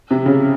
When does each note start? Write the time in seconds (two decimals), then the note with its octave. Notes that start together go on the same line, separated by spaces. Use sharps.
0.11 C3
0.26 C#3